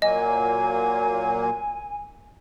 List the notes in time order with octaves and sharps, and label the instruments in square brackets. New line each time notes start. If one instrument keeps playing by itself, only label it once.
[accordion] A#2 F#3 A#3 [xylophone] D#5 [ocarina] G#5